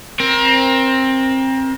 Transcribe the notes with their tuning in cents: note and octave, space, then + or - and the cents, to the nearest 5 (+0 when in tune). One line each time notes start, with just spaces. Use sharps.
C4 +20 A#4 +30